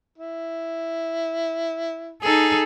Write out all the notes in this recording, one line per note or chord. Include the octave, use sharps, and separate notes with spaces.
E4
D#4 G#4 A4